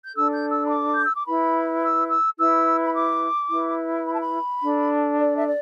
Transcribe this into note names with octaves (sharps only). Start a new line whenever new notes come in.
G6
D4 A4 E6
G6
E6
B5
D6
G6
E6
D6
E4 B4 B5
E6
E6
E4 B4 E6
B5
D6
E4 B4
B5
A5
B5
D4 A4
D5
E5
D5